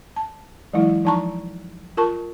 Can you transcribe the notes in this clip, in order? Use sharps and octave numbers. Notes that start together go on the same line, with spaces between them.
A5
E3 F#3 G#3 E4
F3 D#4 A5 A#5 C#6
F4 A#4 A5 C#6